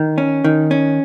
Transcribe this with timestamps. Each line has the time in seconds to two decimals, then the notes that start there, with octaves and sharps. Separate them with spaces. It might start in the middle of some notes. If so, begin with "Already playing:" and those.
Already playing: D#3
0.18 C#4
0.44 D#3
0.71 C#4